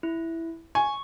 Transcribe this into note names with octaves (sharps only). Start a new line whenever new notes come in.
E4
G#5 C#6